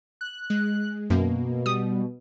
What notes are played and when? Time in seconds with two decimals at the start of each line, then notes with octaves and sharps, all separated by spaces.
0.21 F#6
0.50 G#3
1.10 F#2 B2 A#3
1.66 G3 D#6